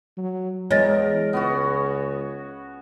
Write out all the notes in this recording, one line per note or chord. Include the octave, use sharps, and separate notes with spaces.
F#3
E2 G#3 A#4 C#5 D#5 A6
C#2 B3 C#4 F#4